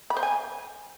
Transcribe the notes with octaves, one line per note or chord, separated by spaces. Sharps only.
B5
C5
G#5